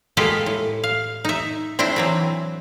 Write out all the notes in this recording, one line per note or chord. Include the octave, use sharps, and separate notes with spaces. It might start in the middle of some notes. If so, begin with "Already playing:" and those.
G#3 A#3 B3 F4 G4 A4
A2
F5
D#4 E5
C4 D4 E4 C5
E3 F#3 C4